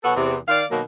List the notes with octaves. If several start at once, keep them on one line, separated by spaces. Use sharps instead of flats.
B2 F#3 B3 F#4 A4
E2 C3
D#3 D5 F5
B2 D#3 F#3 A#3